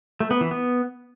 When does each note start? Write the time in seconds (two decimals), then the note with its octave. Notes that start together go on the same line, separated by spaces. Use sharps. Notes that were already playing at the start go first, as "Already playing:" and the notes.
0.20 A3
0.31 B3
0.41 E3
0.51 B3